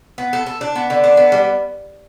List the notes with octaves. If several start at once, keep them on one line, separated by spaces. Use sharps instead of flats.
B3
A4
A4
D4
B3
D3
D4
B3
G3